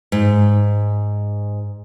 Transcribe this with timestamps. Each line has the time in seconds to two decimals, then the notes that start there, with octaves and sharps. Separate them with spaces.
0.12 G#2